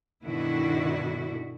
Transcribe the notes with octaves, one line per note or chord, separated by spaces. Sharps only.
G2 B2 D3 D#3 E4 F#4